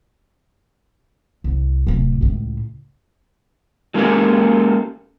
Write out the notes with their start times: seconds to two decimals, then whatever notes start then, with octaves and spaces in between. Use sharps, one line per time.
1.44 C2
1.87 D1 C3
2.21 C#2 A2
3.94 F#3 G#3 A#3 C#4 G4 A4